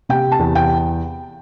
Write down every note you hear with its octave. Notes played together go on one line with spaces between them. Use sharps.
C3 G5
A5
E2
G5